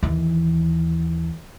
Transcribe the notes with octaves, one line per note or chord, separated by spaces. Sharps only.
D#2 E3